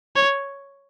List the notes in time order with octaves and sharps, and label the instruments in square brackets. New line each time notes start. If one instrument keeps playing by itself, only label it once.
[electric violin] C#5